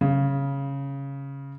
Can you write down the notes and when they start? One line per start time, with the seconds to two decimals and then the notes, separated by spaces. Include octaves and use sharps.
0.01 C#3